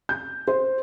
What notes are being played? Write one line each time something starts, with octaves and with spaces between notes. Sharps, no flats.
G6
C5